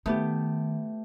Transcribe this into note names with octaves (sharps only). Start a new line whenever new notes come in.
D#3 A3 B3 G4